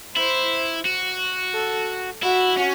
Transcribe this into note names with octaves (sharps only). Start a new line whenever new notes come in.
E4 C5
F#4
A4
E4 F#4
C#4